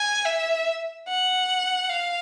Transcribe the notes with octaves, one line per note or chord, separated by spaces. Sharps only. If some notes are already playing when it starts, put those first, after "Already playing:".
Already playing: G#5
E5
F#5
F5